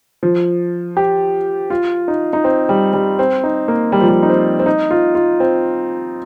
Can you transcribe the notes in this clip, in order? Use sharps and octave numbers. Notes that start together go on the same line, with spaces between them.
F3
G4
F4
D#4
D#4
C4
G3
G3
C4
D#4
A#3
G3
F3
G3
D#4
C4
C4
D#4
F4
F4
C4